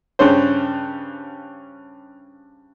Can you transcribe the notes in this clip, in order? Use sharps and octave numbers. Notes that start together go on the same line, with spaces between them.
G2 C#3 C#4 C5